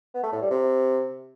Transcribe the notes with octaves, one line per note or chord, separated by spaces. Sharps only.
B3
A3
A2
G3
C3